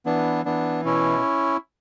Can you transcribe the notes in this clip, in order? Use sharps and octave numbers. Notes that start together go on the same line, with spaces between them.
E3 B3 D4
E3 B3 D4
B2 C#4 E4